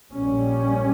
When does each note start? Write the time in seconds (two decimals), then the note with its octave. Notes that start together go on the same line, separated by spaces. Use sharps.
0.12 A#1 A#2 G3 C#4